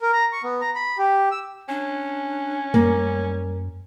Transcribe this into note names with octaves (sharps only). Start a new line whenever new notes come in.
A#4
A#5
C#6
B3
A#5
B5
G4
E6
C#4 D4
F#2 G3 A#3